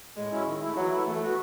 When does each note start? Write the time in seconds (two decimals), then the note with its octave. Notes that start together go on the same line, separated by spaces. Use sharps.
0.16 A2 G#3
0.31 F#3 C#4 E4
0.46 D#3
0.62 A3 E4
0.77 E3 F#3
0.91 A3 E4
1.07 E3 A3
1.22 B3 F#4